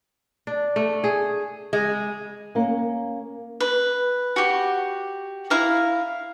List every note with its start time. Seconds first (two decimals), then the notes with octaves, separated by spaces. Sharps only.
0.47 D4
0.76 A3
1.04 G#4
1.73 G#3
2.55 A#3 C#4
3.60 B4
4.36 F#4 G4
5.50 E4 F5 A#5